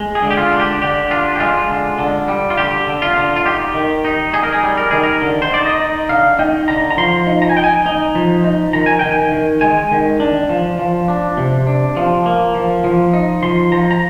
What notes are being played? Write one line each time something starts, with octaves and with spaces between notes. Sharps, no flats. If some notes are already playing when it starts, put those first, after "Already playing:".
Already playing: G#3
G#4
D3
G4
F4
D4
G4
D3 G4
D4 F4
G4
G#3 F4
D3
D3
G3
F4
D3 G4
D3
F4
D3
F4
D#4 G4
D#3
D#4
D#4 G#4
A#4
G#4
G3
A#4
D#3 G#4
A#4
D3
C5
D#4 D5
D#5
D#4
D3 F5
D#4 G5
D3 A#5
A#5
F3 C6
D#4
A#5
G#5
D#4 G5
G#5
D#4
F3
D#4
D#3 A#5
G#5
D#3 G5
G#5
D#3
G#3 G#5
D#3
D4
F3
F3
D4
C3
D4
F3
A#3
F3
F3
D#4
F3 C6
F3 A#5
A#5